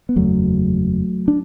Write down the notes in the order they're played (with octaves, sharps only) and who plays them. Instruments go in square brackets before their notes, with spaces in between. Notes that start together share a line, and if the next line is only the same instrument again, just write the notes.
[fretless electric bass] B3
F#1 E2 C#3 F#3 A3
D4